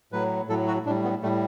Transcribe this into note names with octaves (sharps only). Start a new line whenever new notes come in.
A2 F#3 B4
A2 F#3 A4
F#4
A2 G3 D4
B3
A2 G3 A3